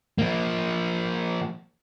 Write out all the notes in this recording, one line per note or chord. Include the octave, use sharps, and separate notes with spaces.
F3 A#3